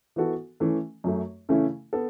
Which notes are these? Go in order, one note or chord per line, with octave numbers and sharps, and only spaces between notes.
E3 B3 F#4 A4
E3 A3 C#4
F#2 F#3 A3
C#3 E3 A3 C#4 E4
B3 A4